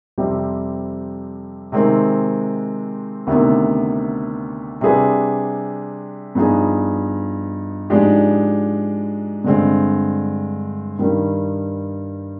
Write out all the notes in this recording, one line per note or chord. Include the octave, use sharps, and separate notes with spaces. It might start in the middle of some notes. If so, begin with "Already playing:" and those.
F2 C3 G3 C4 G4
C3 D#3 G#3 C4
D2 C3 D#3 B3
C3 G3 D4 G#4 B4
G2 F3 B3 D#4 G#4
G#2 F3 G#3 D4 G4
G2 D3 G#3 C4
G2 D#3 G3